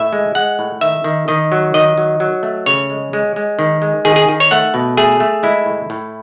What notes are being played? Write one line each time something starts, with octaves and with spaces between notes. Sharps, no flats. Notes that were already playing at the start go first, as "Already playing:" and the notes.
Already playing: A2 E5
G#3
G#3 F#5
A2
D#3 E5
D#3
D#3 D#5
F#3
D#3 D#5
F#3
F#3
A3
C#3 C#5
G#3
G#3
G#3
D#3
G#3
D#3 G#4
G#4
D#3
C#5
A3 F#5
B2
A3 G#4
A3
G#3 E4
A2
A2